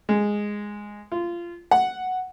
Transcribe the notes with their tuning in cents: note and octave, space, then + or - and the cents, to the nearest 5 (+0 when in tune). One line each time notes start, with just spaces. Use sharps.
G#3 -5
F4 -20
F#5 +0